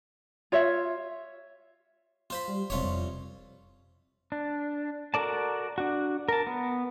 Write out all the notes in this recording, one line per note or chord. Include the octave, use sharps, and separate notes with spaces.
F4 C#5 E5
F4 C5 B5
G3
E1 C2 F4 C#5
F2
D4
F#4 A4 A#4 D5 A5
D4 F#4
A#4 A5
B3